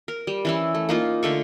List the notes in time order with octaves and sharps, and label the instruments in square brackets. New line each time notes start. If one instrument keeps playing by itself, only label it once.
[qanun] A#4
G3
E3 C#4 E4
A3
A#3 D#4 F4
D3 A3 C#6